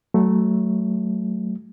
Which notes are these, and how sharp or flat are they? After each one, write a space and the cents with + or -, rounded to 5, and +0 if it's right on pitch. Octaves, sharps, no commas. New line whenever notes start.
F#3 +25 A3 +0